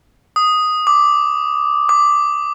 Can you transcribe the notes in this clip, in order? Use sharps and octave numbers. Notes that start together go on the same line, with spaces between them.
D#6
D6
D6